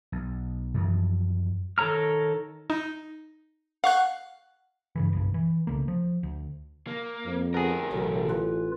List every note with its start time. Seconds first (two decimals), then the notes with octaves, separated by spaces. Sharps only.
0.12 B1
0.74 F#2 E3 F3
1.78 D#3 A4 C#5 A#5 F6
2.70 D#4
3.84 F5 F#5 C#6 F#6
4.96 G2 C#3 E3
5.13 F#1 B1 G2
5.34 E3
5.67 C2 C#3 A3 A#3
5.88 F3
6.23 D2
6.87 A#3
7.25 F2
7.54 D2 B3 G#4 A#4
7.92 A1 B2 D3 F#3
8.30 F4 B4